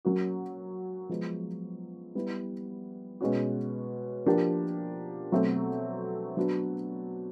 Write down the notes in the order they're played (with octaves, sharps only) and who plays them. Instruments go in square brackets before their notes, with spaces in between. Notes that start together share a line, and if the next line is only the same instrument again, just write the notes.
[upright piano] F#3 A#3 C#4 F#4
F3 G#3 B3
G3 B3 E4
B2 G#3 C#4 F#4
F3 A#3 D4 G4
B2 F#3 A3 C4
F#3 B3 D4 F#4